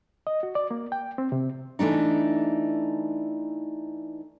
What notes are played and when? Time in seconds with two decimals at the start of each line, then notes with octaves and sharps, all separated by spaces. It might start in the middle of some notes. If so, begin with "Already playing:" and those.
0.27 D#5
0.43 F#4
0.55 D5
0.71 A#3
0.92 G5
1.18 C4
1.32 C3
1.79 E3 A3 D4 D#4